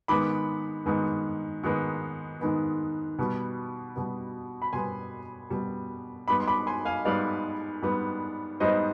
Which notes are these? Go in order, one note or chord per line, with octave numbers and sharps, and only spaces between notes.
G#2 D#3 G#3 B3 B5 D6
G#2 D#3 G#3 B3
G#2 D#3 G#3 B3
G#2 D#3 G#3 B3
B2 G3 B3
B2 G3 B3
B5
B2 G3 B3 G#5 C6
B2 G3 B3
G#2 G3 B3 B5 D6
C6
B5 D6
G#5 C6
F5 G#5
G#2 G3 B3 D5 F5
G#2 G3 B3
G#2 G3 B3 C5 D#5